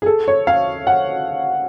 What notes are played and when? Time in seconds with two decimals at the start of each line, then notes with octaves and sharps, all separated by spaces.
0.02 G#4
0.06 A4
0.28 C#5
0.47 F5
0.87 F#5